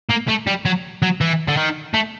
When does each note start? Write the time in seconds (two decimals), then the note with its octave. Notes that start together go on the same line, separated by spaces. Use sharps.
0.10 A#3
0.29 A3
0.47 G3
0.65 F#3
1.02 F#3
1.21 E3
1.48 D3
1.57 D#3
1.94 A3